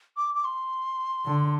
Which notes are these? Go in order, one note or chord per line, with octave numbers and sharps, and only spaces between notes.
D6
D6
C6
D3